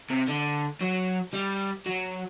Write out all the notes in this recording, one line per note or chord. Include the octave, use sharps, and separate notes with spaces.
C3
D3
F#3
G3
F#3